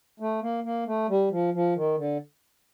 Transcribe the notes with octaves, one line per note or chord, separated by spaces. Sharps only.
A3
A#3
A#3
A3
G3
F3
F3
D#3
D3